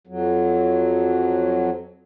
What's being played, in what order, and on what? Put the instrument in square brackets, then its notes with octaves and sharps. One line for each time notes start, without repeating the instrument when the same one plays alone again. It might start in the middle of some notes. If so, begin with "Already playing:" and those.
[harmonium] F2 F#3